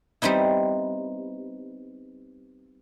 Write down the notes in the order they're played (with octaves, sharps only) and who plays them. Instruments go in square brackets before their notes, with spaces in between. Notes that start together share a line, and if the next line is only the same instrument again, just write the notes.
[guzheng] G3 B3 C4 D#4 E4